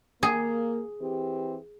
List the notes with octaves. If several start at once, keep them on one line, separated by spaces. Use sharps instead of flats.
A#3 G#4
E3 C4 G4